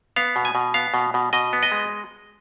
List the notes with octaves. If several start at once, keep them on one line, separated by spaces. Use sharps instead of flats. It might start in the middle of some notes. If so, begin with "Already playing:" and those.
B3 F5
B2
G#5
B2
B3 F5
B2
B2
B2 D#5
B3
D#5
G#3